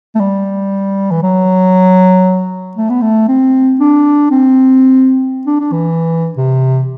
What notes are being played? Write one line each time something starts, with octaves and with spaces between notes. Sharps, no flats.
A3
G3
E3
F#3
A3
B3
A3
C4
D4
C4
D4
D4
E3
C3